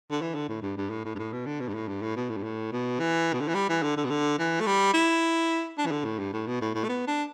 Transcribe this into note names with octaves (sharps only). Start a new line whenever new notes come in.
D3
E3
D3
A2
G2
G2
A2
A2
G2
A2
B2
D3
B2
G2
A2
G2
A2
B2
A2
G2
A2
B2
E3
B2
D3
E3
G3
E3
D3
D3
B2
D3
E3
A3
G3
E4
D4
E3
D3
A2
G2
A2
B2
A2
A2
A3
B3
D4